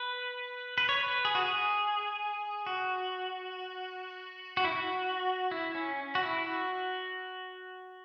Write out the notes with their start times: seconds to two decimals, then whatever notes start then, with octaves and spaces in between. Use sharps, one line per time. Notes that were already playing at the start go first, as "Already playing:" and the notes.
Already playing: B4
0.78 B4
0.89 C#5
1.01 B4
1.25 G#4
1.35 F#4
1.45 G#4
2.67 F#4
4.57 F#4
4.64 E4
4.72 F#4
5.51 E4
5.75 C#4
6.15 F#4
6.23 E4
6.46 F#4